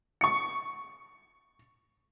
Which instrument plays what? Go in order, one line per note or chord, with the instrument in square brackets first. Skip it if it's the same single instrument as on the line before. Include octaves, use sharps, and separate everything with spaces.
[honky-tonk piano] C#6 C#7